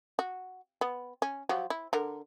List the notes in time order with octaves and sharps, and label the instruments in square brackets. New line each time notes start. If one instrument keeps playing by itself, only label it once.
[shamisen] F#4
B3
C#4
F3 F#3 G4
E4
D3 A#4